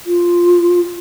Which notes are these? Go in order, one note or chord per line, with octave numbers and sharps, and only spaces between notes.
F4